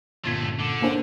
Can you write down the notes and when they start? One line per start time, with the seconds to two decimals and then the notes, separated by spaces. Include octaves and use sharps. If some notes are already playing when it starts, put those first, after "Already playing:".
0.25 G1 C#2 A#2 A3 C6 G#6 B6
0.59 D3
0.82 A#3 C#4 D4 C5